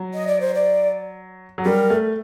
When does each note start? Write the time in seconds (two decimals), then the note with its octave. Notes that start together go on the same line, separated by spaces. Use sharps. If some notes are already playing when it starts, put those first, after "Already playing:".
Already playing: F#3
0.14 D#5
0.27 D5
0.41 C5
0.55 D5
1.58 F#3
1.65 G3 A#4
1.90 A3